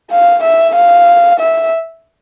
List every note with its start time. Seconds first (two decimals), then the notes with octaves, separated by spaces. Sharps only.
0.11 F5
0.44 E5
0.75 F5
1.40 E5